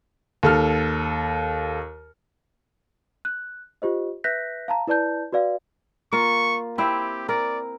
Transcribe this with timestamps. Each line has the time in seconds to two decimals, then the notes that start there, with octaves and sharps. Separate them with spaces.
0.43 D#2 A4 F6
3.25 F#6
3.82 F4 G4 C5 D#5
4.24 B4 E5 F#6 G6 A#6 B6
4.68 F5 A5 A#5
4.87 E4 B4 D5 A5 G6
5.32 F#4 B4 D5 F5
6.13 A#3 F4 C#6
6.78 C4 E4 G4
7.29 A#4 D5